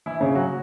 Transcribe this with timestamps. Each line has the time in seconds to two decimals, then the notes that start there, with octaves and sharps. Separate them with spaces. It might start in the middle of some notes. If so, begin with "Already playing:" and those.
0.06 E3 E4
0.20 C#3 C#4
0.35 F#3 F#4